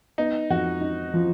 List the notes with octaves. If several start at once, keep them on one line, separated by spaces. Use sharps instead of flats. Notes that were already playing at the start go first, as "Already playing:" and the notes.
B3 D#4
F2 F#4
D#4
F3